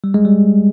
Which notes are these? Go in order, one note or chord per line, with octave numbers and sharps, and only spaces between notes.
G3
G#3
G3